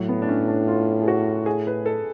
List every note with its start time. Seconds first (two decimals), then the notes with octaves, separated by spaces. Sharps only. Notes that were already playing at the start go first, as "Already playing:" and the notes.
Already playing: A2 F#3
0.09 B3
0.22 D4
0.29 C#4
0.48 D4
0.68 F4
1.02 G#4
1.08 F#4
1.46 G#4
1.67 B4
1.86 A4